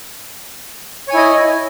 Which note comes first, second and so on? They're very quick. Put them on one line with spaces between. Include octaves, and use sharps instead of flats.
C#5 G#5 E4 D#5